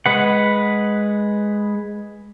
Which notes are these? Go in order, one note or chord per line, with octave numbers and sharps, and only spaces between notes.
G#3 B4 F#5